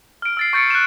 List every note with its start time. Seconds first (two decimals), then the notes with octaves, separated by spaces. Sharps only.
0.22 F6 D7
0.37 E6 A6 C7
0.53 C#6 G6 A6 C#7 D7
0.70 F#6 E7